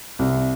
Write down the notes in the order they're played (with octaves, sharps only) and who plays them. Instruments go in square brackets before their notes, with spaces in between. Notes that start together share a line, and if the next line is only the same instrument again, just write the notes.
[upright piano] C2